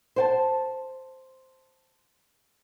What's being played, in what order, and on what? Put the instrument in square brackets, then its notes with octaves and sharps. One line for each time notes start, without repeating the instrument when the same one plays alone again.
[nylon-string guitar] C5 G5 A5